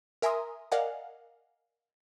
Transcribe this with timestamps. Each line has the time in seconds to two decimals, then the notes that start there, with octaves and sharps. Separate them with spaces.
0.22 A#4 E5 G#5 A#5 C6 D#6
0.72 A#4 D5 D#5 F5 F#5 G#5